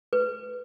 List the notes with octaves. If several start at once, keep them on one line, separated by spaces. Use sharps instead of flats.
B4